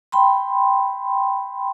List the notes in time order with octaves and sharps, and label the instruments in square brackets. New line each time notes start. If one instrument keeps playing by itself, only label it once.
[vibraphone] G5 B5 C6